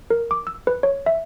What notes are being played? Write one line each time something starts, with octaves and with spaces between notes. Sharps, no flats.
A#4
D6
E6
B4
C#5
E5